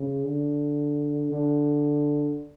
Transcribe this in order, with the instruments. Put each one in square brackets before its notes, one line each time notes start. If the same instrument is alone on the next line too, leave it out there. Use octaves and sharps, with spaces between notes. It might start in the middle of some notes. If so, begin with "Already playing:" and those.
Already playing: [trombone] C#3
D3
D3